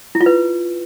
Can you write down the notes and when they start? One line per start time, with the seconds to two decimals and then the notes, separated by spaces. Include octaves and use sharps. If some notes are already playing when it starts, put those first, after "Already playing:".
0.15 E4
0.21 F4
0.26 B4